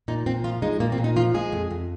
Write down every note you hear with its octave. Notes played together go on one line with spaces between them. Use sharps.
A#2 D#4
A#2 C4
F3 F4
G#3 D#4
A#2 A#3
C4
A#2
D#4
F3 F4
G#3 G#4
F2
F2